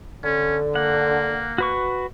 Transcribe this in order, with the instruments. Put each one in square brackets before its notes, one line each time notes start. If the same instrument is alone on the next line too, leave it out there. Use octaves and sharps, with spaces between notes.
[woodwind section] D3 [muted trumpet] C#4
[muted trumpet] A#3 [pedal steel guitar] F#5
[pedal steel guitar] F#4 B4 C#6